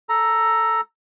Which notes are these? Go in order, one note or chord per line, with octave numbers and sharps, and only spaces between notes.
A4 A#5